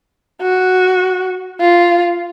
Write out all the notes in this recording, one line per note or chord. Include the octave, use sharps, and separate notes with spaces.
F#4
F4